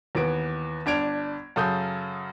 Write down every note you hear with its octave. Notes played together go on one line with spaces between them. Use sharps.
D#2 E3 B3 D7
G1 D4 G#6 D7 F7
F#2 C#3 A4 D#6 G6